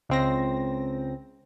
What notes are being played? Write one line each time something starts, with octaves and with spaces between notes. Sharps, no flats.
C#2 C4 A#6